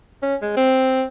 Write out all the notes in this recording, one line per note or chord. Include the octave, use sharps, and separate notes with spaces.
C#4
G#3
C4